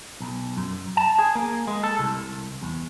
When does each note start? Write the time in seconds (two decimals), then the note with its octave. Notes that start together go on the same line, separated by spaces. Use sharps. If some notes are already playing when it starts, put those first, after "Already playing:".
0.20 B1
0.57 F#2
0.97 A5
1.19 G#4
1.35 A#3
1.67 G#3
1.83 A4
1.99 C2
2.62 E2